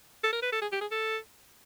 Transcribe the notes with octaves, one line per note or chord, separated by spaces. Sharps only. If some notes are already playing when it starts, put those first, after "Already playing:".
A4
A#4
B4
A4
G#4
G4
G#4
A4